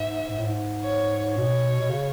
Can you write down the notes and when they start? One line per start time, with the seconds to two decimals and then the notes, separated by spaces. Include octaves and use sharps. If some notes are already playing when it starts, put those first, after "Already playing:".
Already playing: G#2 E5
0.30 G#2
0.38 A2
0.46 G#2
0.83 C#5
1.37 B2 C#5
1.81 B2
1.90 C#3